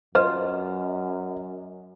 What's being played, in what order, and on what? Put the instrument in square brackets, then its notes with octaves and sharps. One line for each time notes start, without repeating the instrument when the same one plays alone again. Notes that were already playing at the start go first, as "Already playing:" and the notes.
[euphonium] F#2 [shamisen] F4 C5 [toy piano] B4 [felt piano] D#5